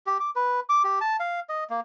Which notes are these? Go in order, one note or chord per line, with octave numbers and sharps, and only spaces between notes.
G4
D6
B4
D6
G4
A5
F5
D#5
A#3